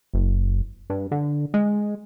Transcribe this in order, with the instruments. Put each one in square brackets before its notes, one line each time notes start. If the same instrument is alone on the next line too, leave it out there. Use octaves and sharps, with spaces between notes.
[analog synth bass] F#1
G2
D3
G#3